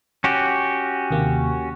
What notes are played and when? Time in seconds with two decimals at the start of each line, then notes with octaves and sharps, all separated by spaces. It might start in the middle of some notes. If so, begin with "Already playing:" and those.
0.24 C#4 F#4 G4
1.11 D#2 C3 A#3